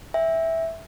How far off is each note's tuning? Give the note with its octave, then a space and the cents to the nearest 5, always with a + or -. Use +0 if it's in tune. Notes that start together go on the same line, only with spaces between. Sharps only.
E5 -10 G5 +30